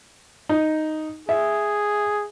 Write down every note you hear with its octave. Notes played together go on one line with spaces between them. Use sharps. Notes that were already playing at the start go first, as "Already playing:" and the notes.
D#4
G#4 E5